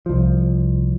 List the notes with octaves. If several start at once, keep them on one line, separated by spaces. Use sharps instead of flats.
C2 F3